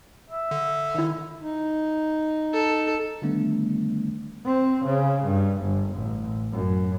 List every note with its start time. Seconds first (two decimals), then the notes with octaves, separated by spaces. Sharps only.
0.30 E5
0.51 D3
0.95 D#3 E4
1.42 D#4
2.53 A4
3.22 D3 D#3 G3 A3 B3 D4
4.46 C4
4.85 C#3
5.25 G2
5.62 G1
5.94 A1
6.52 F#2